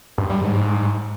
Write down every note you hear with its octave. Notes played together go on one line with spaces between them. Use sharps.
G2
G3
G#2